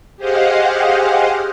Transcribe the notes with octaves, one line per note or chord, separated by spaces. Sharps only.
G4 G#4 C5 D#5 F5 F#5